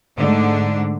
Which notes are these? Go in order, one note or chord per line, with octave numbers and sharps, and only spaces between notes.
G#2 D3 A3 D4